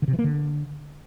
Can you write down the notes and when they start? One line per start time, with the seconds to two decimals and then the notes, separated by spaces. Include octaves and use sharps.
0.02 D3
0.08 C3
0.13 E3
0.19 A#3
0.24 D3